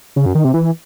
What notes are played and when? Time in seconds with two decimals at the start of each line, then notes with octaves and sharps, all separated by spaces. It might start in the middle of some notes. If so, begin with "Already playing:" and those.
0.16 C#3
0.26 F#2
0.35 D#3
0.44 C3
0.54 E3